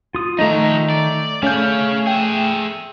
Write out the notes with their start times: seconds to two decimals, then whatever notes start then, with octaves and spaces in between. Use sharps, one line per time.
0.15 F4 D#6
0.39 D#3 F3 A3 D#4 D#5 A#5
0.90 D5
1.43 A3 C#4 G#4 F5 G6
2.07 G#4 E5 G5